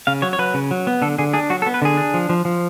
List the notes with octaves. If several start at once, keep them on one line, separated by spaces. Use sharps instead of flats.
C#3 F5
F#3 C#5
C#5
F#3 B4
C#3
F#3
B3
D3 A4
D3 G#4
D4 G#4
F#3 F#4
A4
B3
B4
D3 G#4
D4
F3
F3
F3